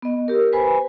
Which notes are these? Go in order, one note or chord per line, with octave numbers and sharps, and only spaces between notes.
B3 D#5
G4 A#4
B4 C5 G#5 B5